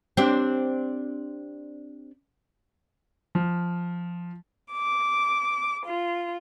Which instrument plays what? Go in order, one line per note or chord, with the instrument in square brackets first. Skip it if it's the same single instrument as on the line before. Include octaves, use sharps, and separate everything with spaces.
[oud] C4 D4 G4
[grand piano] F3
[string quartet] D6
F4